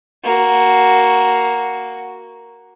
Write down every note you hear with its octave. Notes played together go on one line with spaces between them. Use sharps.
A#3 F#4